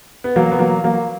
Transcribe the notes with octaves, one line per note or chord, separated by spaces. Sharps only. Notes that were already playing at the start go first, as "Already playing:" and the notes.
B3
F#3 A#3
B3
F#3 A#3
F#3 A#3